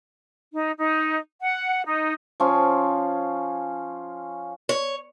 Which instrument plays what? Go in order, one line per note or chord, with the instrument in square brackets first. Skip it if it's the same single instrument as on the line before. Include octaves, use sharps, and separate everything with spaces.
[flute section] D#4
D#4
F#5
D#4
[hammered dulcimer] F3 C#4 F4
[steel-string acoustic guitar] C#5